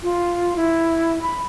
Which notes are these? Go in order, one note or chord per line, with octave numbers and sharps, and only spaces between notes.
F4
E4
B5